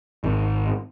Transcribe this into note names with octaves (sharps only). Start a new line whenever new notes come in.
G#1